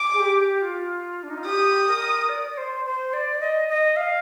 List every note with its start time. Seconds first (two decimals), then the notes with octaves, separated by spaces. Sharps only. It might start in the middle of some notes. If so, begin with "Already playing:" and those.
Already playing: D6
0.14 G#4
0.20 G4
0.62 F4
1.23 D4
1.30 D#4
1.38 F4
1.45 G4 D#6
1.88 A#4
2.29 D5
2.51 D5
2.58 C5
2.85 C5
3.13 D5
3.40 D#5
3.68 D#5
3.96 F5